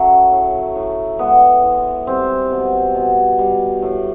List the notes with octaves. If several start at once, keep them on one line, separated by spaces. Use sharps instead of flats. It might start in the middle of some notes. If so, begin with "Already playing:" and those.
Already playing: C#3 F#3 A3
A2
A2
G#3 B3
E3
G3 C4
B2
B2
G3
A2